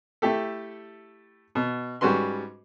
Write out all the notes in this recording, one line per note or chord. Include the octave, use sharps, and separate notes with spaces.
A3 E4 G4 A4
B2
G#2 G3 C#4 F#4 B4 C6